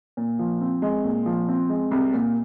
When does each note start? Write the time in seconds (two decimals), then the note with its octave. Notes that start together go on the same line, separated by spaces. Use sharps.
0.17 A#2
0.39 F3
0.61 C4
0.82 G#3
1.04 A#2
1.26 F3
1.48 C4
1.69 G#3
1.91 C2
2.13 A#2